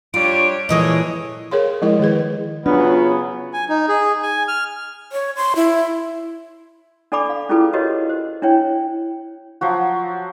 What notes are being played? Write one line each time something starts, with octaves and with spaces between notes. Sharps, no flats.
G3 D4 F4 C#5 D7
A#2 E3 G#3 G#4 A4 C#5 D#5
G#4 A#4 C#5 F5 C6
F3 G#3 E4 A#4 D#5
D#3 G#3 G#4 B4
C#3 F#3 B3 D4 F4
G#5
D#4
G#4
G#5
F6
C#5
C6
E4
D4 A4 D5 G#5 B5 D6
F5
C#4 E4 F4 G#4 A4 B4
F#4 G4 A#4 B4 C#5 D#5
C5
D4 E4 C#5 G5
F3 F#3 F#4